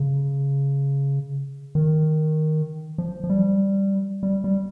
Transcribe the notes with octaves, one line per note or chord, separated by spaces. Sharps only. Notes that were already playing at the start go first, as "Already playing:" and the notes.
Already playing: C#3
D#3
F3
F3
G3
G3
G3